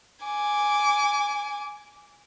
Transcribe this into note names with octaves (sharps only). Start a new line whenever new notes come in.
G#5 D6